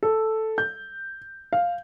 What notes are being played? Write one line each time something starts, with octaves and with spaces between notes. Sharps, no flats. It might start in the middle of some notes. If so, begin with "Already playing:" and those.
A4
G6
F5